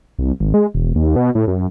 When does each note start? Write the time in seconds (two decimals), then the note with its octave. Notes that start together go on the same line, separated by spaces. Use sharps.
0.19 C2
0.40 G#1
0.54 G#3
0.74 E1
0.95 D#2
1.16 B2
1.35 A2
1.48 F#2